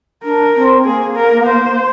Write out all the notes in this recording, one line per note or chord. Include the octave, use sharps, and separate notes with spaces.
D4 A#4
C4
A#3 G#4
A#4
C5